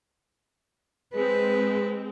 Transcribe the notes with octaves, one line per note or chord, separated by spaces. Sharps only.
G#3 C4 B4